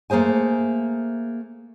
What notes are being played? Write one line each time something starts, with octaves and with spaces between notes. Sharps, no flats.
A3 A#3 G#4 C5 G#5